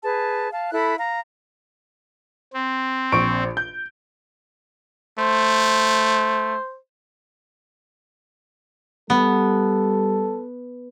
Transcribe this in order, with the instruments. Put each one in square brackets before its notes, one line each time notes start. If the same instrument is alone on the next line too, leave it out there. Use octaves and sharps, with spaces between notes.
[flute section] G#4 B4 A5
F5 A5
E4 A4 B5 F#6
F5 A#5
[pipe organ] C4
[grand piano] A#1 C#6 D7
G6
[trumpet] A3 [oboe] C5
[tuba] G3 [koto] B3 [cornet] A4